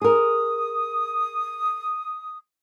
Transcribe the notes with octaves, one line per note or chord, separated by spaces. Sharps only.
G#4 A#4 D#6